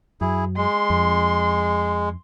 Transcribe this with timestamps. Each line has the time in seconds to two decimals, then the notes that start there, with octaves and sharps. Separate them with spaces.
0.21 F#2 F#3 E4 G#4
0.57 G#3 C6
0.90 F2